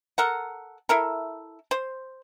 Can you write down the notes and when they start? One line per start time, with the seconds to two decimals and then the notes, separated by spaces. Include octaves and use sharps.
0.18 A4 A#4 F#5
0.89 E4 A4 A#4
1.71 C5